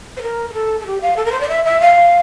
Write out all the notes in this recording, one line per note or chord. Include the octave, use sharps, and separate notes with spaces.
C5
A#4
A#4
A4
A4
G4
F5
A4
A#4
C5
D5
E5
E5
F5